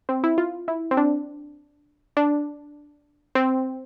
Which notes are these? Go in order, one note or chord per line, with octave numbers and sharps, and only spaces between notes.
C4
E4
F4
E4
C4
D4
D4
C4